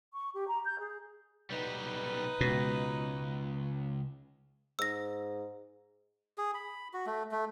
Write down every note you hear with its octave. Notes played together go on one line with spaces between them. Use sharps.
C#6
G4
A#5
G6
G#4
B1 G3 D#4 B4
C#2 B2
G#2 E6 A#6
G#4
B5
F#4
A3
A3